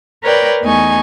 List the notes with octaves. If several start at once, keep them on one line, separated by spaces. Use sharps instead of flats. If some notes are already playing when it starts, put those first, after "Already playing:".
A#4 B4 C#5 D5 G5
E2 A3 D#4 G#5 C#6